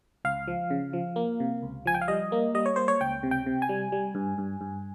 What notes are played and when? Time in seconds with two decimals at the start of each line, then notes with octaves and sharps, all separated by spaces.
0.25 C#2 F5
0.48 F3
0.70 C#3
0.93 F3
1.16 A#3
1.40 C3
1.62 C#2
1.86 F3 G#5
1.94 G5
2.01 F5
2.08 G3 D#5
2.32 A#3
2.54 G3 D#5
2.66 C#5
2.76 A#3 C5
2.88 C#5
3.01 C#2 G5
3.23 C3
3.31 G5
3.46 C3
3.62 G#5
3.69 G3
3.92 G3
4.15 G2
4.38 G2
4.61 G2